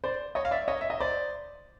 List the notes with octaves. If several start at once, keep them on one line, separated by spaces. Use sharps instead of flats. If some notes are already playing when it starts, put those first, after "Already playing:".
C5 D5
C#5 D#5
F5
D5 E5
C#5 D#5
E5
D#5
C5 D5